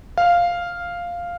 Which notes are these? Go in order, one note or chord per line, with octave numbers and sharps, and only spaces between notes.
F5